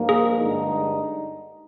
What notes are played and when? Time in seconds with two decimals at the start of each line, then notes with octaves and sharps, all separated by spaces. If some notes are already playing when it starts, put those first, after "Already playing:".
Already playing: G2 F3 A#3 D#4
0.09 G#4
0.39 G2 D3 G#3 D#4